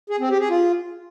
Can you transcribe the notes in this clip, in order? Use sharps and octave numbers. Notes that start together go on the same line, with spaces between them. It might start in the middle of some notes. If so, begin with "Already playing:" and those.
G#4
C4
G4
G#4
F4